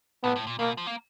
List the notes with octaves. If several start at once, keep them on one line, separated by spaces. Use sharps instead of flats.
A2 B3
A2
A#2
B2 A#3
F3
A#3